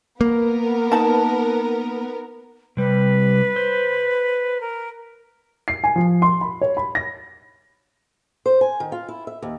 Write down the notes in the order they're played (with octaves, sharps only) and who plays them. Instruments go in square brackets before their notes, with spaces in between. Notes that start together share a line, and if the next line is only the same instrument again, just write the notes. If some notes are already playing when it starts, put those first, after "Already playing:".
[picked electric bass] A#3 [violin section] B3 A#4
[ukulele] D#4 A5
[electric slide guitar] C3 G3 [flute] B4
[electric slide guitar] C5
[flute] A#4
[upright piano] C7
G#5
F3
C6
B5
C#5
B5
A#6
[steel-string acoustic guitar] C5
G#5
D#3
F4
E4
E5
D#2